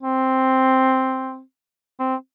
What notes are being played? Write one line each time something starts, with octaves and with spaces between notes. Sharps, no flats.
C4
C4